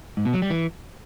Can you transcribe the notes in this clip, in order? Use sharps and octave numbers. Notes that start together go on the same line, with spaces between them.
G#2
B2
F#3
G3
E3